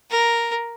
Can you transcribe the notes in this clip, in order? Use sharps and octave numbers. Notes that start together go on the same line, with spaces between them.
A#4